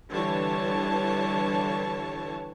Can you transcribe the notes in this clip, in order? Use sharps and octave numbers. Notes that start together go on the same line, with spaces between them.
D3 E3 G3 C#5 A5